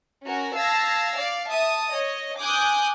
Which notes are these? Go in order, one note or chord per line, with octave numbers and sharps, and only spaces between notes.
C#4 F#4 A#4
F5 A5 E6 G#6 A#6
D5 F5
E5 A5 D#6
C#5 D#5
G#5 D6 D#6 F#6 G6